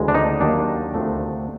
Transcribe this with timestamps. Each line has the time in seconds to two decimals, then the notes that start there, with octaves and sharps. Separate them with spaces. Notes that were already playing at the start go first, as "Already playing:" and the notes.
Already playing: D2 C#3 E3 G#3
0.08 D4
0.14 D#4
0.41 D#2 D#3 F#3 A#3 D4
0.94 D2 C3 F3 A3